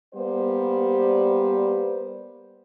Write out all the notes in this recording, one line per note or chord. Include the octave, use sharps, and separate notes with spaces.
G3 A#3 B3 B4 C5 D5